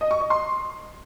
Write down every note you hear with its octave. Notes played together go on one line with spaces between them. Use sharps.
D#5
C#6
D#5
C6